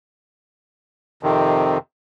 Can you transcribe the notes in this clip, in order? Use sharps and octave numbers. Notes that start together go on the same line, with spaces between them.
F2 C3 D#3